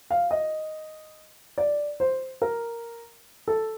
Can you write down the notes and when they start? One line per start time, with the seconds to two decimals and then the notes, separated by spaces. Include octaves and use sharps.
0.10 F5
0.31 D#5
1.58 D5
2.00 C5
2.42 A#4
3.48 A4